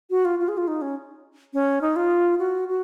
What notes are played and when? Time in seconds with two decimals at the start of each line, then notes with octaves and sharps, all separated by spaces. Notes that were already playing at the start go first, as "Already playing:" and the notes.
0.10 F#4
0.25 F4
0.39 F4
0.48 G#4
0.57 F4
0.67 D#4
0.82 C#4
1.53 C#4
1.81 D#4
1.96 F4
2.39 F#4
2.68 F#4